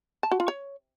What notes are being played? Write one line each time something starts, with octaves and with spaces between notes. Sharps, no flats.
A5
F#4
F4
C#5